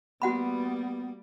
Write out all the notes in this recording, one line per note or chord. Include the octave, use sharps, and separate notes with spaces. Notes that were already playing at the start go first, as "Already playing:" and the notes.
G3 A#3 B3 F#4 F#5 B5